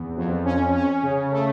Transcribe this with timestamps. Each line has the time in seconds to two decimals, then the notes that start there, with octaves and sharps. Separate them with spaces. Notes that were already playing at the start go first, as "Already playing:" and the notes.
Already playing: E2
0.17 F2
0.45 C#4
0.75 C#4
1.03 C#3
1.32 A3